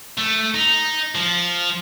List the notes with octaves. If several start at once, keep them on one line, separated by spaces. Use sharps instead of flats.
A3
D#4
F3